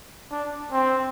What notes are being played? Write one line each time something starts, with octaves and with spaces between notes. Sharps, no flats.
D4
C4